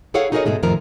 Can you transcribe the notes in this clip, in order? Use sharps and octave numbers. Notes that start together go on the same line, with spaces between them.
E4 G#4 A4 C#5 F5 F#5
D#4 F#4 G#4 A#4 C#5 D#5
G#2 B2 G#3 A3
F2 A2 D#3 F3 A3 A#4